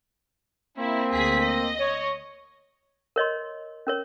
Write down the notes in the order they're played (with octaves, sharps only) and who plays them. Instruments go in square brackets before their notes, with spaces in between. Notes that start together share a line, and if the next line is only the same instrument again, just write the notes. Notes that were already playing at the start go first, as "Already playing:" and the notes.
[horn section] A#3 C4 [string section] E4
[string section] D2 G#4 B6
D#5
[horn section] C#5
[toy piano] A#4 C#5 D#5 C6
C#4 A#4 C#5